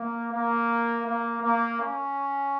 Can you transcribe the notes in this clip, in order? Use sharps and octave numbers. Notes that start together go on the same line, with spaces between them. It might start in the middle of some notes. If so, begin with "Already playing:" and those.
Already playing: A#3
A#3
A#3
A#3
C#4